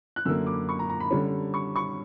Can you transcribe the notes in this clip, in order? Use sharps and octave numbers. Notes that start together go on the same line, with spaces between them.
F#6
F#2 D3 A#3 E6
D6
C#6
A#5
A#5
B5
D3 G3 C#4
C#6
C#6